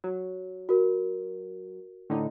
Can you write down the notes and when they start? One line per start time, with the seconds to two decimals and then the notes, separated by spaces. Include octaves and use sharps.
0.04 F#3
0.69 F#4 A#4
2.10 A2 D3 D#4